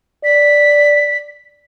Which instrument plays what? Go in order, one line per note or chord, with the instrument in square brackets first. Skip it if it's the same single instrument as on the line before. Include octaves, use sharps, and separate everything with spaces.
[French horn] D5 [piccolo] B6